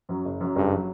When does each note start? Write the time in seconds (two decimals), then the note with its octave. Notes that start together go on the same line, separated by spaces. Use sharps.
0.09 F#2 F#3
0.25 F#1
0.40 F#2 F#3
0.56 F#1 G2
0.75 F#3